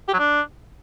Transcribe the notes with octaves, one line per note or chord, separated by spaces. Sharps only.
G4
F#3
D4